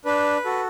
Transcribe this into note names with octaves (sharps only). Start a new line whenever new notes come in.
D4 B4
F#4 A4